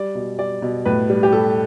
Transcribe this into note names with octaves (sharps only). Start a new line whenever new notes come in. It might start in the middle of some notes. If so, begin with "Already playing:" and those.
Already playing: G3 D5
B2
G3 D5
B2
A2 B4
G3
G4
G3 A4